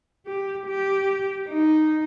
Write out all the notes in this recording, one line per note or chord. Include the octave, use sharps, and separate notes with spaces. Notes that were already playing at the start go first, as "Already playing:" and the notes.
G4
G4
D#4